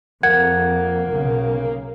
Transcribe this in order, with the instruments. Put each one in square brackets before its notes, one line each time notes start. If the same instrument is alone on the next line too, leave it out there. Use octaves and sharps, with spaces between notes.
[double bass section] F2 [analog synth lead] A#3 [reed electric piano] F#5 [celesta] G#6
[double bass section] B1 C#3